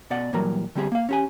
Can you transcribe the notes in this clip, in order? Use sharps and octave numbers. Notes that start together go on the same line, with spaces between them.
B2 D5 F#5
A#2 E3 F#3 G3 A#4 A#5
D3 G3 C4 G4 G#4
A#3 F5
C#4 G4 G#5